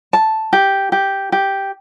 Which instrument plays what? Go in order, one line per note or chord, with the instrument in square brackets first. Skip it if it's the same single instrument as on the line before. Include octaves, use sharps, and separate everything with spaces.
[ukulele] A5
G4
G4
G4